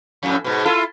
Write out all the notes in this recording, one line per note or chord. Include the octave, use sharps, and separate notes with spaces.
F2 A2
G#2 B2
E4 F4 A4